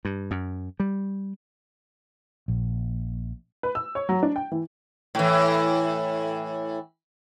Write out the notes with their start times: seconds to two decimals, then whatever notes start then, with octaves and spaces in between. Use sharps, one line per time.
0.05 G2
0.31 F#2
0.80 G3
2.48 A#1
3.63 B4
3.75 E6
3.95 C#5
4.09 F#3
4.23 D4
4.36 G5
4.52 E3
5.15 A2 E3